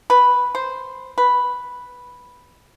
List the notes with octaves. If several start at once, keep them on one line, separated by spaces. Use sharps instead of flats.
B4
C5
B4